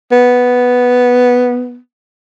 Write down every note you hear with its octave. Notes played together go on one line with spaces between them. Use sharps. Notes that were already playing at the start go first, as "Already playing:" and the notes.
B3